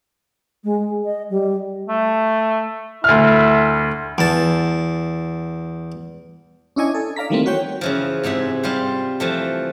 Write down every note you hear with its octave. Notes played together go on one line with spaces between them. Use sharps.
G#3
D#5
G3
A3
D2 E4 F6
E2 A5
C#4 D4 E4 C#5 D#5 G#5
A4
D5 F5 A#5 B6
D#3 E3 G3 A3 A#3 C4
F#4 C#5 G5
C#3 E3 F3
G#2 C3 G#4 E5
G3 F4 C5
E3 F3 A3